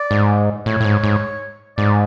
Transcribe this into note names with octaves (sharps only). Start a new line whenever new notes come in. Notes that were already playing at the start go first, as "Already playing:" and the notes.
Already playing: D5
G#2
A2 C#5
A2
G#2
G#2
G#2 D5